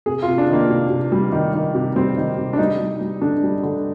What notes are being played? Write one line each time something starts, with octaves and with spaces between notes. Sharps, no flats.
C3 G#4
F4
C3
D4
D#3 A#3
C3
C3
G3
D#3
D#3
C3
G3 C4
D#3
C3
D4
G3 D#4
G3
G3
D3 D4
G3
D3